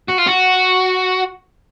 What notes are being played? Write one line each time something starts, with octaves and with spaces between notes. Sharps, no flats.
F#4
F4
F#4